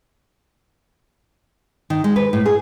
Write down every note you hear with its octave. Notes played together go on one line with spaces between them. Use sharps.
D#3
G#3
B4
A2
G#4